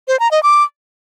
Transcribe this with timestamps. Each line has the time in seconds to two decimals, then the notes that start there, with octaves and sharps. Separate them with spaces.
0.08 C5
0.20 A#5
0.31 D#5
0.43 D6